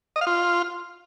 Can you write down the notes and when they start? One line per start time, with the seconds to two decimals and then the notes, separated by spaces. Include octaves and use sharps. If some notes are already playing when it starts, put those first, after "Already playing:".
0.16 D#5
0.21 F5
0.27 F4